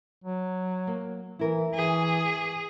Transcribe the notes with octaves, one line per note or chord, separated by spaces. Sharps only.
F#3
A#3
E3 E4 A#4
E3 G#4